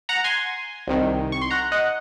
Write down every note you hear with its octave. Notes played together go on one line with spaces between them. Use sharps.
F#5 A#5
G#5 C6
C2 C3 D#3
C#6
C6
F#5 A#5
D#5 F#5